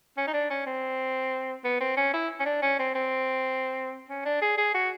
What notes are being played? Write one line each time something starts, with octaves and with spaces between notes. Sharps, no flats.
C#4
D#4
D4
C#4
C4
B3
C4
C#4
E4
C#4
D4
C#4
C4
C4
C#4
D4
G#4
G#4
F#4